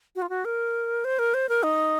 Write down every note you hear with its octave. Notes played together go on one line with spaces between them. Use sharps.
F#4
F4
F#4
A#4
C5
A#4
C5
A#4
D#4